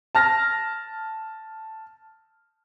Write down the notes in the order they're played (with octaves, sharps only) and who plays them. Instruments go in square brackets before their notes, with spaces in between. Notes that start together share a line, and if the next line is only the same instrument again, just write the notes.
[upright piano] A5 F6 A#6